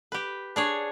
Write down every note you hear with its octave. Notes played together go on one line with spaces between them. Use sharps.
G4 B4
D4 G#4 C#5